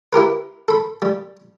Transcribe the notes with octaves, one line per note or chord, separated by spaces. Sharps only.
E4 G4 A#4 B4
A4 B5
G3